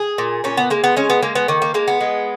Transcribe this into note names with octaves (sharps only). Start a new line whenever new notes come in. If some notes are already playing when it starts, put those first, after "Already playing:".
Already playing: G#4
A#2
A#2 C#4
B3
G#3 A#3
B3
G#3 C#4
B3
G#3 A#3
B3
D#3 A#3
A#3
G#3 A#3
B3
G#3